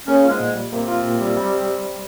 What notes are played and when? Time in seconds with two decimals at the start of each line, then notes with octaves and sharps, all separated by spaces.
0.07 C#3 A#3 C#4
0.24 F4
0.29 G#2 G#3
0.40 A#2
0.56 G3
0.72 C3 A#3 C4
0.88 F4
1.04 A#2
1.21 G3
1.37 G3